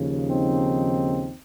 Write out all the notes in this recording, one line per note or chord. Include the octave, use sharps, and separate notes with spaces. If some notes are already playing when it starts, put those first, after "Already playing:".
Already playing: D#2 C#3 F3
C4 D#4